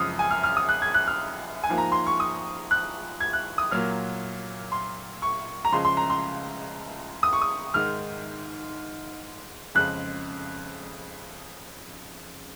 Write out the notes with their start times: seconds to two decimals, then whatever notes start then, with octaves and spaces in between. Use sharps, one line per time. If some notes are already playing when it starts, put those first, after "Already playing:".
Already playing: F#2 C#3 F3 G#3 D#6 F6
0.19 G#5
0.30 F6
0.43 F6
0.57 D#6
0.69 F#6
0.82 G#6
0.94 F#6
1.07 F6
1.64 G#5
1.69 G#2 F3 A#3
1.78 A#5
1.92 C6
2.07 C#6
2.20 D#6
2.71 F#6
3.20 G#6
3.33 F#6
3.58 D#6
3.71 A#2 F#3 A#3 F6
4.72 C6
5.22 C#6
5.65 A#5
5.72 C#2 C#3 F3 G#3 C6
5.85 C6
5.97 A#5
6.10 C6
7.23 D#6
7.33 C#6
7.42 D#6
7.74 G#2 D#3 G#3 F6
9.75 F2 C#3 G#3 F#6